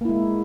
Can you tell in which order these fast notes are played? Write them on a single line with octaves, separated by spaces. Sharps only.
A#3 E4 G#3